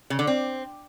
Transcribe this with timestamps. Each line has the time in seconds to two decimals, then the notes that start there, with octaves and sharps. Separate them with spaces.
0.10 C#3
0.19 D3
0.27 C4